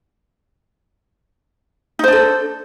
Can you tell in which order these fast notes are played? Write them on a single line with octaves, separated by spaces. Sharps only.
D#4 C5 D4 A4